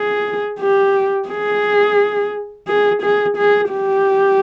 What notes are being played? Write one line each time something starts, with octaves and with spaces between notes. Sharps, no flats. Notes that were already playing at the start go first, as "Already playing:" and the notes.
Already playing: G#4
G4
G#4
G#4
G#4
G#4
G4